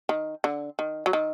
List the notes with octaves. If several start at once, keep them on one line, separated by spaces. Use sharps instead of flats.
D#3
D3
D#3
F#3
D#3